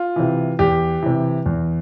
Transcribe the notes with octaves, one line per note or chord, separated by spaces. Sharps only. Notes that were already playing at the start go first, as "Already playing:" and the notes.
Already playing: F4
C3 E3
E2 G4
C3 E3
E2